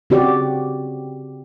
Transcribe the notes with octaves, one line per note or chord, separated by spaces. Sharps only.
C#3 C4 F#4 G4 D5